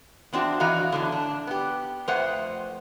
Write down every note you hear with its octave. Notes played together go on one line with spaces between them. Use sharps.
E2 C4 D4 F#4
E3 F#4 D#5 F5 A#5
E2 A2 D3
D4
B3 G4
F2 A3 B4 C5 F#5